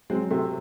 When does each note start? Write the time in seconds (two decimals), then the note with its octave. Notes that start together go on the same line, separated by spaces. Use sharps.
0.10 F#3 G#3 C4
0.31 C3 A3